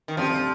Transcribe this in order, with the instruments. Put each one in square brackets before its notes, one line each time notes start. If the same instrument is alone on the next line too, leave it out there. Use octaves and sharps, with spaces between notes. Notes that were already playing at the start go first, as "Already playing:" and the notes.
[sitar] D#3
[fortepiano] D2 C3 G3 C4 [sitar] F3